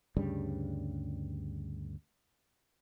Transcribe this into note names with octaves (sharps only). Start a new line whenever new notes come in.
D2 G2 C#3 G3